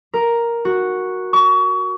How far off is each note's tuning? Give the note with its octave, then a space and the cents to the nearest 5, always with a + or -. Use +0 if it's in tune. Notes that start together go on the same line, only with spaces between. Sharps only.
A#4 +5
F#4 -5
C#6 +30